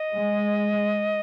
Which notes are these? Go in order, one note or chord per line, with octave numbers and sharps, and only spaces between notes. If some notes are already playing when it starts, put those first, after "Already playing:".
Already playing: D#5
G#3